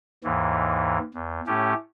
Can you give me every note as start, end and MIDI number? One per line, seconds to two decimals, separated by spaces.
0.24 0.99 39
0.24 0.99 44
0.24 0.99 52
1.14 1.40 40
1.47 1.74 45
1.47 1.74 57
1.47 1.74 61
1.47 1.74 67